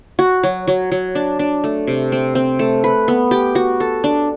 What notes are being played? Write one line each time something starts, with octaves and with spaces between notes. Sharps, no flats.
F#4
F#3
F#3
F#3
D4
D4
A3
C3
C4
C4
A3
B4
B3
G4
F#4
A4
D4